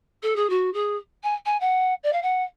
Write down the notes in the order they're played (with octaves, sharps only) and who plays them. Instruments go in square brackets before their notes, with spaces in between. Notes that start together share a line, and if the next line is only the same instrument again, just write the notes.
[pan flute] A4
G#4
F#4
G#4
G#5
G#5
F#5
D5
F5
F#5